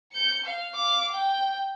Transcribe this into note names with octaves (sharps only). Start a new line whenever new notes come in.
G6 C#7
F5
F5 D6
G5